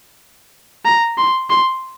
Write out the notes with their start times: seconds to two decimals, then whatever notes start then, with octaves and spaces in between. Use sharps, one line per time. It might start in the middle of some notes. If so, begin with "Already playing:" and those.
0.85 A#5
1.18 C6
1.50 C6